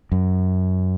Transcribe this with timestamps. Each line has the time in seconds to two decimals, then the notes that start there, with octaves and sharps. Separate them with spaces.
0.12 F#2